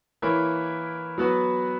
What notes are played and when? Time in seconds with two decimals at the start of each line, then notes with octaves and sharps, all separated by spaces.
0.22 E3 A#3 E4 A#4 C#5
1.18 F#3 B3 F#4 B4